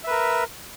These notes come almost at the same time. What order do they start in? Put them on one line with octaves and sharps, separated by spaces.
E5 B4 A#4